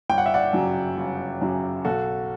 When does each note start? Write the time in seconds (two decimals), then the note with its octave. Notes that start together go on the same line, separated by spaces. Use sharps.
0.09 G1 G5
0.18 F#5
0.26 E5
0.34 D5 F#5
0.53 F#2 C#3 F#3
0.97 G1
1.41 F#2 C#3 F#3
1.85 B1 F#4 A4